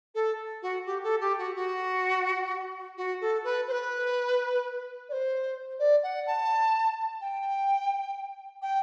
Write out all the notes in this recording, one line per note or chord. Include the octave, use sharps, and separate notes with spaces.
A4
F#4
G4
A4
G4
F#4
F#4
F#4
A4
B4
C5
B4
D5
C5
D5
F#5
A5
G5
G5